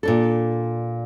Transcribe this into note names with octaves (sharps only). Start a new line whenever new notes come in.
A#2 D4 A4